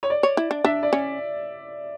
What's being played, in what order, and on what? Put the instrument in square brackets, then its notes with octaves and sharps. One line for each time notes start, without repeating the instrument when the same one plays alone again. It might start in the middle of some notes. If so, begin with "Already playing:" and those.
[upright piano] C#5
D5
[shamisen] C#5
E4
D4
[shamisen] D4 [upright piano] E5
[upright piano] D5
[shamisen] C#4